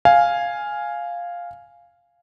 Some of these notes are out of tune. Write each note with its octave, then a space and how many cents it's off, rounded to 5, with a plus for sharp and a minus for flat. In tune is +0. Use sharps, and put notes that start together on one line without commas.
F5 +0 G#5 +0